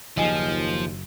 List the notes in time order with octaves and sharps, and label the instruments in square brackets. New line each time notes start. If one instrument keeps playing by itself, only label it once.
[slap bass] F#1 [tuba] D#2 [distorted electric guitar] F3 [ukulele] D#4 F4 G#4